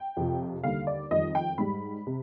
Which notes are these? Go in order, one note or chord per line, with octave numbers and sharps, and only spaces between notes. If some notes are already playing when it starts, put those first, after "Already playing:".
Already playing: G5
F2 C3 F3
D#2 D3 G3 F5
D5
F2 D#3 G3 D#5
G5
G#2 G3 B5
C3